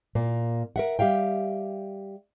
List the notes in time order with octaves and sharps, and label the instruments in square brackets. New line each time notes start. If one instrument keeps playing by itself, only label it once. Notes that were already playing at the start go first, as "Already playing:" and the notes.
[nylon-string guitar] A#2 A#3
A#4 E5 F#5
G3 G4 E5 F5 G5